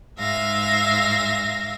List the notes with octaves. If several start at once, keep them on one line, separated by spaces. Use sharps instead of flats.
G#2 E5 F5 A#6